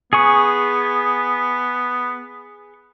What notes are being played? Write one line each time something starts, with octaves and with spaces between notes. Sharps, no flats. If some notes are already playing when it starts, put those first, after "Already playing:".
B3 G#4 G#5 C#6